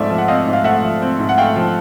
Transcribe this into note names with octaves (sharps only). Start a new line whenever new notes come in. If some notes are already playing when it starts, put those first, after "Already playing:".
Already playing: G#2 F3 A3 C4 D5 E5
F3
F#5
C4 D#5 F5
G#2
F5
A3 E5 F#5
F3
C4
G#2
F#5
A3 F5 G5
F3